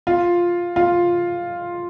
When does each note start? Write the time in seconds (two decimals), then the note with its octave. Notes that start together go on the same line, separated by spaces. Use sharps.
0.07 F4
0.76 F4